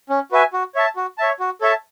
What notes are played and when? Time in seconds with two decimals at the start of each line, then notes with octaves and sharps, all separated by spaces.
0.09 C#4
0.32 F#4 B4 E5 G#5
0.53 F#4
0.75 C#5 E5 A5
0.96 F#4
1.18 C#5 E5 A5
1.40 F#4
1.61 A4 C#5 E5 A5